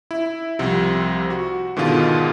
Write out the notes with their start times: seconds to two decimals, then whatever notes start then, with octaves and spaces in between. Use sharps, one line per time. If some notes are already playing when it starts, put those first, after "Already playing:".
0.11 E4
0.59 C2 C3 F3
1.30 F#4
1.77 G#2 B2 D3 D#3 F4